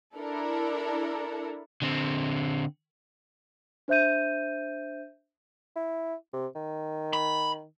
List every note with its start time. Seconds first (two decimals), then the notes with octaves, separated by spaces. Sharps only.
0.16 D4 E4 A4 A#4
1.82 D3 C4
3.88 D4 C5 E5 G6 D#7
5.76 E4
6.33 C3
6.55 D#3
7.13 B5